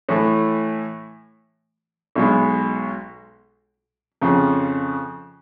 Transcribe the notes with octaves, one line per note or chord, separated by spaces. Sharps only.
A2 E3 A3
B1 B2 G#3
F2 C#3 F3